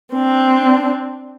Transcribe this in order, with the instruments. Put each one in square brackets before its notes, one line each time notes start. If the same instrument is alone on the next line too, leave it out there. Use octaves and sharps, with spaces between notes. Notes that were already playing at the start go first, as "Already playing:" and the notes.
[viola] C4 D4